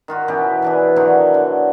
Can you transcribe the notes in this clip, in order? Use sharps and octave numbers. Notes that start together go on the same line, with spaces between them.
D#3 F4 F#4
B2 E3 C#4 G4
E3 D4 G#4
D3 D#3 F#3 G4
D3